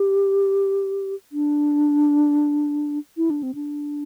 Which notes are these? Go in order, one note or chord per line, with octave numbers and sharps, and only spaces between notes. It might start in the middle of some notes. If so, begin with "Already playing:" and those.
Already playing: G4
D4
E4
D4
C4
D4